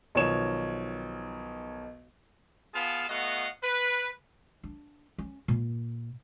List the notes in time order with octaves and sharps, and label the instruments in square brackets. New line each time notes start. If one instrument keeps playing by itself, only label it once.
[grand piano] B1 D#3 F3 C#5 E7
[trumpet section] B3 F4 G#4 F5 A5
A3 B3 F#4 D#5 F5 F#5
B4
[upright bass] D4
C#4
A#2